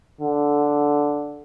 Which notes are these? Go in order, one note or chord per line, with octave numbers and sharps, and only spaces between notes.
D3